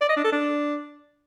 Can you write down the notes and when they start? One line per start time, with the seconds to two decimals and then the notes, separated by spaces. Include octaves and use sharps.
0.01 D5
0.09 D#5
0.17 D4
0.24 A4
0.32 D4